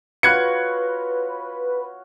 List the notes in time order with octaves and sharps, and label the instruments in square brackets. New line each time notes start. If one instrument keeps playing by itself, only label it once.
[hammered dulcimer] F4 F#4 C#5 [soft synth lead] B4 [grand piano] F#6 G#6 C#7